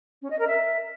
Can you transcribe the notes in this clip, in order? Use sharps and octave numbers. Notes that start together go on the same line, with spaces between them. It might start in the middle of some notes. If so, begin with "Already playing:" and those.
C#4
D#5
A#4
E5